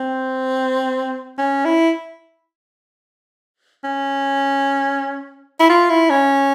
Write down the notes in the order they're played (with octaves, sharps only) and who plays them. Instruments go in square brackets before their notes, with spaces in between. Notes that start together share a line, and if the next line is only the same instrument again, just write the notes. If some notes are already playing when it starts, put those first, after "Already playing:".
Already playing: [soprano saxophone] C4
C#4
E4
C#4
E4
F4
E4
C#4